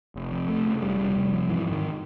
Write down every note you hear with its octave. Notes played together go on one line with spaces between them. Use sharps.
F1
F2
F1 A3
C#3
F1 G3
F1
F1
F2
G#2 E3
G#2
D#3